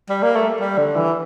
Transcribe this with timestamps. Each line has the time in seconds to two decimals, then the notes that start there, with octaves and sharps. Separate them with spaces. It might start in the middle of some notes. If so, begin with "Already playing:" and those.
0.09 G3
0.23 A#3
0.36 A3
0.60 G3
0.78 D3
0.96 E3